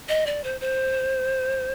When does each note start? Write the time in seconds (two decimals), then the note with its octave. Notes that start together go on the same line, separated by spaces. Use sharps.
0.09 D#5
0.26 D5
0.44 C5
0.61 C5